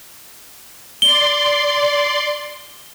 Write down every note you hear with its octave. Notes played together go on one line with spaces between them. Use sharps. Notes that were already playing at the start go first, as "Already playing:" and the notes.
D5 C6 G7